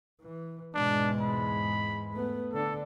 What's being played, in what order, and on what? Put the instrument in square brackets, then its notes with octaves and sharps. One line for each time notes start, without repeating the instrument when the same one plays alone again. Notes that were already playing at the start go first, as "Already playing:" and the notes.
[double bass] E3
[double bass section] E2 G#2 G#3 [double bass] B2 [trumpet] D4
[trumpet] B5
[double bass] A3 B3
[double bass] D3 D4 [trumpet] A4